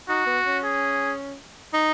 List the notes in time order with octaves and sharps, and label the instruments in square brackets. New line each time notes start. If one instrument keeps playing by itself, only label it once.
[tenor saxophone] D#4 [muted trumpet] F#4
[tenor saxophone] B3
C#4
[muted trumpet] G#4
[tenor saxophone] D#4